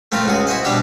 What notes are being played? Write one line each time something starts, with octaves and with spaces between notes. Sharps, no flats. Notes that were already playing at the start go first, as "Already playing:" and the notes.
A3 C4 F4 A#4
C#2 F#4 G#4
E4 F#4 C5 D#5
B2 G3 D4 G4 E5